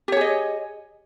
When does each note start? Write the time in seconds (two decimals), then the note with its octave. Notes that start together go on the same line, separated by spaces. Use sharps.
0.08 G4
0.12 C#5
0.17 G#4
0.21 D#5